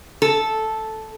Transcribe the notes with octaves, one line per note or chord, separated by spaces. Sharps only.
A4